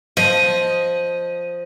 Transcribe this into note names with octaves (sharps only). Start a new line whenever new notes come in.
F3 D#5